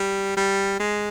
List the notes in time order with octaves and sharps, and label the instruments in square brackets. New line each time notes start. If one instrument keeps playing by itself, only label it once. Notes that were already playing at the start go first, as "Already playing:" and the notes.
Already playing: [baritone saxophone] G3
G3
G#3